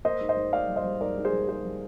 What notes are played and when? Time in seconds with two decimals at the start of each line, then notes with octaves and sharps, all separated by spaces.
0.05 A#3 C5 D#5
0.21 G#2
0.29 C5 D#5
0.37 G#2
0.53 A#3 D5 F5
0.68 G3
0.76 C5 D#5
0.84 G3
1.01 G#2 A#4 D5
1.17 G#2
1.25 G#4 C5
1.33 G3
1.48 G#2 G#4 C5
1.65 G3